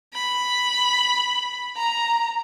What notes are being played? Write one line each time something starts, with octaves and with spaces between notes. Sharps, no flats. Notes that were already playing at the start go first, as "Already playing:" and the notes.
B5
A#5